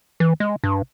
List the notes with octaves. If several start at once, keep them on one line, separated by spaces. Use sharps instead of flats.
E3
G#3
G2